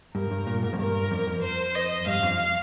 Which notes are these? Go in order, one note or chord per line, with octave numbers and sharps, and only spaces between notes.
G2 A#4
G2
A#2
G#2
F2
G2 A#4
F2
F2
C5
D#5
G2 F5
F2